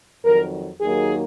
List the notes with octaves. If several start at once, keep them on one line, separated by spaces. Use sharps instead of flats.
F2 D#3 F#3 A#4
D#2 D#3 F#3 A#3 G#4